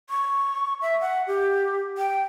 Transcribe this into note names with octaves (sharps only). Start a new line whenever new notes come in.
C#6
E5
F#5
G4
G5